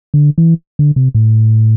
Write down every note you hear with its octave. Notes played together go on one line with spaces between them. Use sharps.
D3
E3
D3
C3
A2